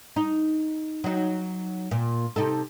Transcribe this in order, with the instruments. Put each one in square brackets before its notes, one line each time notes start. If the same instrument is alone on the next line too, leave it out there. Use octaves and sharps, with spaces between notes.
[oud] D#4
F#3 D#4
A#2
C3 D#4 A4